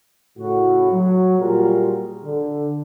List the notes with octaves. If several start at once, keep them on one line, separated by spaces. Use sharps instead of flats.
A2 C#3 F#4
F#3
A#2 G3 F4 F#4 G#4 A#4
D3